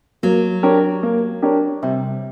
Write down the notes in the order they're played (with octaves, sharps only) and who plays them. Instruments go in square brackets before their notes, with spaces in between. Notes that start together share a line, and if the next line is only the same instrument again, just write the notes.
[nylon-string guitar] F#3 [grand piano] A#3
[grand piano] D4 G4 A#4 C#5
A#3
D4 G4 A#4 C#5
[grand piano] C3 [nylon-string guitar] G3